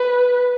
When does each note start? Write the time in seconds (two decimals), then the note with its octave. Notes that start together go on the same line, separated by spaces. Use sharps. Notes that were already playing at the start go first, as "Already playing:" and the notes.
Already playing: B4